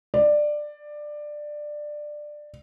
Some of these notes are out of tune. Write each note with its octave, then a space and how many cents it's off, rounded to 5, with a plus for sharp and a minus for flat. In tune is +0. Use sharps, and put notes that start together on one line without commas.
D5 +15